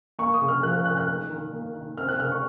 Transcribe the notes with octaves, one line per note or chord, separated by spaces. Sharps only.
A#3 C#6
D#6
C#3
F6
F3 F#6
F#6
C#4 F#6
F#6
D#4
D#3
A#3
D#3
C4 F6
F#6
C#3 F6
C#6